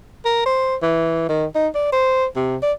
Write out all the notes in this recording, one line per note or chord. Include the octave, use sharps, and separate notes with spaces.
A#4
C5
E3
D#3
D#4
D5
C5
C3
D5